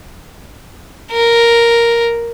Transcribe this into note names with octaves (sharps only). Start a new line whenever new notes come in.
A#4